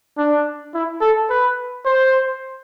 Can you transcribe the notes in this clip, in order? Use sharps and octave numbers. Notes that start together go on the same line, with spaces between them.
D4
E4
A4
B4
C5